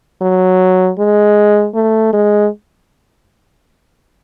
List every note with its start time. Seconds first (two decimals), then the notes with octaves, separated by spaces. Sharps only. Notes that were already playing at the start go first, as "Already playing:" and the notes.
0.21 F#3
0.99 G#3
1.75 A3
2.13 G#3